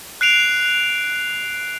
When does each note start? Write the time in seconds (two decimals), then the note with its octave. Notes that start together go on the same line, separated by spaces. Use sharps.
0.21 F#6 C7 D7 F7